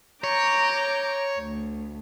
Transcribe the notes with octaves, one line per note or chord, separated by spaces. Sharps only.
C#5 A#5 D6 G6
D2